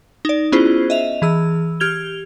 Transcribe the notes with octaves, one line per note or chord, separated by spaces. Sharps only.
D#4 D5
B3 C#4 E4 F4 G#4 C5
D#5 E5 F7
E3 G#4 E6
G4 F6 G#6 F7 G7